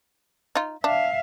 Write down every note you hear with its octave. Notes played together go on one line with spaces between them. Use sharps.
D#4 F4
D4 E5 F5